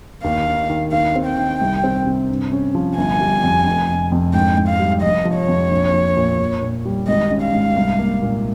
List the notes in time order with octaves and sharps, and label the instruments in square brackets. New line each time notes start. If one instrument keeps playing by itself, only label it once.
[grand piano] D#2 [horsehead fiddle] F5
[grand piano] D#4
D#3
[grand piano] D#2 [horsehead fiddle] F5
[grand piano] C4
[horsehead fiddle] G5
[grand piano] D#3
C2
C4
C3
G2
C#4
F3
[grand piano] G1 [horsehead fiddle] G#5
[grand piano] G3
F2
F1
F1
F2
[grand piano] G#2 [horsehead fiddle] G5
[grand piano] G#2
[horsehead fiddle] F5
[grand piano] G3
[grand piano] F1 [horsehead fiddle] D#5
[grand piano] F3
[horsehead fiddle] C#5
[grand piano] F2
A#1
A#1
A#2
A#2
A#2
G3
[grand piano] G#1 [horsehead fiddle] D#5
[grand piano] C#4
[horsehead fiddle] F5
[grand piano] G#2
C2
A#3
A#2